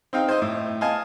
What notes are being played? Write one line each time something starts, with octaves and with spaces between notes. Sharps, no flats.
C4 D#4 F5 G5
C5 D#5
A2
D#5 F5 G#5 A5